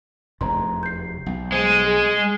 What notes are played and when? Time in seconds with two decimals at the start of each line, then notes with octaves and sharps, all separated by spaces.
0.41 F1 E2 A#5 C6
0.83 G6 C7
1.26 B1
1.52 G#3 C5
1.85 G#4